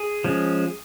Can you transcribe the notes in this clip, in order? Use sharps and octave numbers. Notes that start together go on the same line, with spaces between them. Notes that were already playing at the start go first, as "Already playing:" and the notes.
Already playing: G#4
F3 G#3 C#4